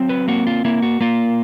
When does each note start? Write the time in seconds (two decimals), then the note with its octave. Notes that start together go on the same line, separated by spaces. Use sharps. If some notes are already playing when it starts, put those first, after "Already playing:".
Already playing: F#3 C4
0.09 B4
0.28 A#3 F#4
0.47 F4
0.65 A#3 E4
0.82 F#4
1.01 A#3 F4